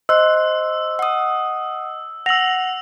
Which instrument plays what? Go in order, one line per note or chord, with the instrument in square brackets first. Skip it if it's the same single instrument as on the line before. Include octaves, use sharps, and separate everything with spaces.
[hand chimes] C5 C6 F#6 [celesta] D#5 [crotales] E6
[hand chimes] F#5 D#6
[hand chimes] F#5 [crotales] E6 F7 [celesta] A#6 F#7